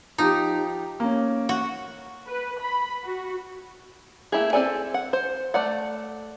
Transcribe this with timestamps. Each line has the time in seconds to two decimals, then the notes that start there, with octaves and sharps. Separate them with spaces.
0.18 F3 D#4 G4
1.00 A#3 C#4
1.49 F#4
2.27 B4
2.60 B5
3.04 F#4
4.32 A3 A#3 E4 G4 G#4
4.53 C4 D#4 A4 D5 G#5
4.94 F#5
5.13 C5
5.54 A3 D5 F#5